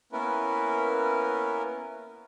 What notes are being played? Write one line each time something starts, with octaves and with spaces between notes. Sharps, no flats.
A#3 B3 C#4 E4 A#4 B4